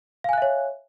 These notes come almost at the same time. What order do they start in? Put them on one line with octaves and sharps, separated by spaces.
F5 G#5 F#6 E5 C#5